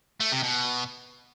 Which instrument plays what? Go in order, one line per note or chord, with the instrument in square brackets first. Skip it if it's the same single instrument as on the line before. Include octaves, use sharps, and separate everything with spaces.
[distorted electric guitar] A3
C3
B2